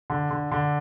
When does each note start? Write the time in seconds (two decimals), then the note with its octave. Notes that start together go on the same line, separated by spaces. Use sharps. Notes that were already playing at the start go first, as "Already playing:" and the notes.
0.10 D3
0.30 D3
0.51 D3